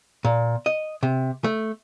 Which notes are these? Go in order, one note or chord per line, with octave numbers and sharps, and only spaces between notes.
A#2
D#5
C3
A3